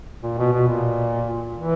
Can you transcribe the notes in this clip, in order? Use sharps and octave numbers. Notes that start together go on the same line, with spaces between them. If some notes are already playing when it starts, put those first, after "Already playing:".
A#2
B2
B2
A#2
E3